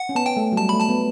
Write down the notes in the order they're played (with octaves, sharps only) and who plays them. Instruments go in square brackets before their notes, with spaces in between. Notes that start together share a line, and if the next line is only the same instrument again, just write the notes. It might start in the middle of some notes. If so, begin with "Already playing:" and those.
Already playing: [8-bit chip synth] F#5
[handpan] C#4
[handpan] B3 [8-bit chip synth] A5
[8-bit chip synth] G5
[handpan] A3
F#3
[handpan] G3 [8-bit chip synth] A5
[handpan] A3 [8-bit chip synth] B5
[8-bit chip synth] A5
[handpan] B3